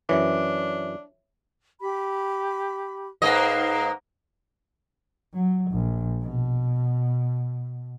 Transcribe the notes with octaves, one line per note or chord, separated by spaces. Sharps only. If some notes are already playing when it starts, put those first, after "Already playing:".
F#2 E3 D4 C#5 E5
G4 B5
G#2 A#3 B4 D#5 F5
F#3
A#1
B2